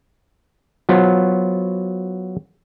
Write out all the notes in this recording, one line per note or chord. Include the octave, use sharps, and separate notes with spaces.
F#3 B3 F4 C5